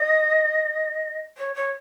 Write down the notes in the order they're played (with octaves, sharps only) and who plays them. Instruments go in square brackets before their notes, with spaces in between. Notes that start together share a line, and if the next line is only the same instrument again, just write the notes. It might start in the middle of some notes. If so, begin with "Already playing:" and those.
Already playing: [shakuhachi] D#5
C#5
C#5